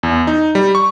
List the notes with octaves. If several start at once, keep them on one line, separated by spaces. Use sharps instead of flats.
E2
D#4
G3
C#6